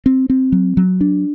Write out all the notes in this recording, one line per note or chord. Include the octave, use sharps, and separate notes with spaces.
C4
C4
F#3
F#3
D4